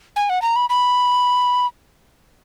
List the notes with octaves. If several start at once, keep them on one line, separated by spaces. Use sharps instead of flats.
G#5
F#5
A#5
B5
B5